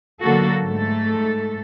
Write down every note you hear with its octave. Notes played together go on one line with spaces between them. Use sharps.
D3 F#3 A#3 F#4 A4
G#2 A3 A4